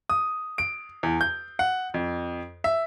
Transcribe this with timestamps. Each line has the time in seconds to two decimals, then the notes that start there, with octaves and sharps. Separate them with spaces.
0.10 D#6
0.58 D7
1.03 E2
1.21 G6
1.59 F#5
1.94 F2
2.64 E5